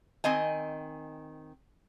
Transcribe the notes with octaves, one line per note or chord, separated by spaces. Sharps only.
D#3 C4 D#5 G#5